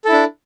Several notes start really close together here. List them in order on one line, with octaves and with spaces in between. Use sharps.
A4 E4 D4